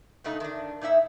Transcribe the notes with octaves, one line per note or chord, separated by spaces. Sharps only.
A#2 C#3 G#3 A3 D#4
D#3 D4
A#2 D#4 E4 E5